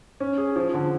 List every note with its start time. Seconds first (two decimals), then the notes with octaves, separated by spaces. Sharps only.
0.20 C#4
0.38 G#4
0.56 F3
0.74 D3